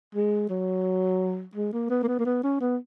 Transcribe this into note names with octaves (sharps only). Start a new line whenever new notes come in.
G#3
F#3
G#3
A#3
B3
A#3
B3
A#3
B3
C#4
B3